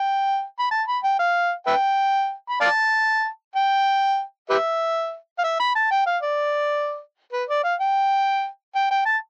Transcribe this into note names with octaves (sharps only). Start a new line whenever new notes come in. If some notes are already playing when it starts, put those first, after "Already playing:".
Already playing: G5
B5
A5
B5
G5
F5
B4 E5 G5
B5
D5 F5 A5
G5
G4 B4 E5
F5
E5
B5
A5
G5
F5
D5
B4
D5
F5
G5
G5
G5
A5